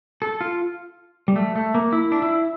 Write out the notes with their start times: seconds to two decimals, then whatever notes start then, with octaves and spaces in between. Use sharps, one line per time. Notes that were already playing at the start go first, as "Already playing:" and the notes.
0.22 A4
0.41 F4
1.28 G3
1.36 A3
1.56 A3
1.75 A#3
1.92 E4
2.12 D4
2.22 E4